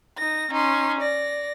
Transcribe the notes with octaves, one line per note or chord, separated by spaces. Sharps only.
D#4 A#6
C#4 D#4 C6
D5 A#6